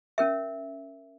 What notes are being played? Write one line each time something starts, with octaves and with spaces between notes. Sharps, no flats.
C#4 A#4 E5